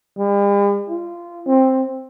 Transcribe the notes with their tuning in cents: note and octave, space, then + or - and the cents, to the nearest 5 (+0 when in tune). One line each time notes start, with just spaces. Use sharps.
G3 +45
F4 -20
C4 +10